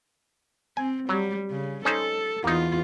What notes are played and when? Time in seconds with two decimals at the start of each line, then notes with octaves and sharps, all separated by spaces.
0.77 C4 G#5
1.09 F#3 G3
1.51 C#3
1.85 C#4 D#4 A4 C5
2.44 E2 A#3 D#4 F4